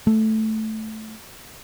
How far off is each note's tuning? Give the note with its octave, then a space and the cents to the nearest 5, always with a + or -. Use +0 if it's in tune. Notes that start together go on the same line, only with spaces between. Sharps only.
A3 -5